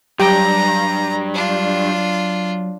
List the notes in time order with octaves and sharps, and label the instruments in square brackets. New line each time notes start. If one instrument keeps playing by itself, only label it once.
[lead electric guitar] G2 [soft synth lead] F#3 [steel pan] G4 G5 [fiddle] A#5
[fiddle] D4 F4